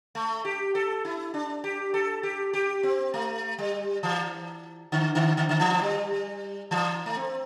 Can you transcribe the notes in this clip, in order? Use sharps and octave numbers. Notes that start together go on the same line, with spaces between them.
A3
G4
A4
E4
D4
G4
A4
G4
G4
C4
A3
G3
E3
D3
D3
D3
D3
E3
G3
E3
A3
C4